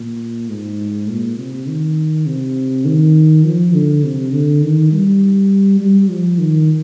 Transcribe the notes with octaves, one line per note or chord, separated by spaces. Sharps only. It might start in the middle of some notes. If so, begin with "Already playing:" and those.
Already playing: A#2
G#2
A#2
C3
D#3
C3
D#3
F3
D3
C3
D3
D#3
G3
G3
F3
D#3